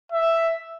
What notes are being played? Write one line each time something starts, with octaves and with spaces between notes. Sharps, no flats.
E5